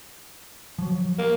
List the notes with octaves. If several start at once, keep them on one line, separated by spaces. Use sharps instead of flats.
F3 F#3
A#3